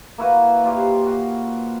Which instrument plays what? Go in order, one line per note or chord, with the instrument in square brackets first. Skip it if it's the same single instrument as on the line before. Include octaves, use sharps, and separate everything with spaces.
[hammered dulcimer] A#3 E4 F#4 B4
A#2 F4 G4 C#5
C5
F#4